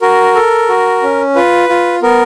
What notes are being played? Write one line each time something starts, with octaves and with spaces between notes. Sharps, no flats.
F#4 A#4
A4
F#4
C#4
F4 B4
F4
B3 A#4